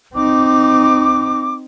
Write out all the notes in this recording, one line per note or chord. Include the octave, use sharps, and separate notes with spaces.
C4 D#4 D6